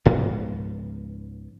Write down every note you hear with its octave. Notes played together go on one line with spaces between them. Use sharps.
C#2 G#2 F3 B3